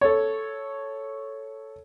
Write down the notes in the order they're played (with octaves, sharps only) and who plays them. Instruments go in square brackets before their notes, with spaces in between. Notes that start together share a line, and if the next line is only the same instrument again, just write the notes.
[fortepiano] A4 C#5